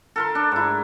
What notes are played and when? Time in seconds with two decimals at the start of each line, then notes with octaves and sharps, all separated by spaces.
0.16 A4 A#4 C6
0.35 D4
0.52 G#2 E4